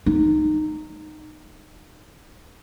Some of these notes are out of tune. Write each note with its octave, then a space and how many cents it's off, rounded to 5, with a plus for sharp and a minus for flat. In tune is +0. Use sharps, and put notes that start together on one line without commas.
D#4 -15